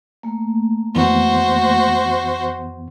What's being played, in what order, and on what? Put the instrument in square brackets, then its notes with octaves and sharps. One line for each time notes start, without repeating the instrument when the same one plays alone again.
[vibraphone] A3 A#3
[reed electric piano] F2 E3 B3 [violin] F#4 C5